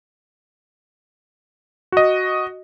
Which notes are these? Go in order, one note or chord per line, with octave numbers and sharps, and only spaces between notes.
F#4 D#5